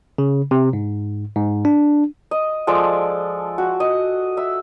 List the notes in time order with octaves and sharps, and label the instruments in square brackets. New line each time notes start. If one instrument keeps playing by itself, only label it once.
[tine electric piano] C#3
C3
G#2
G#2
D4
[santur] D#5
F3 G#3 A4 D5
F#4
D#5
E5 E6